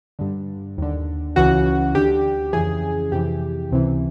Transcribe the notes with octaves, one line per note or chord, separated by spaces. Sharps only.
G2 D3
D#2 D3
C#2 C#3 E3 F#4
D2 D3 G4
F2 C#3 E3 G#4
F2 C3 E3 G4
C#2 C3 E3